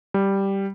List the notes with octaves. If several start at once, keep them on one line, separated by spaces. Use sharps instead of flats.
G3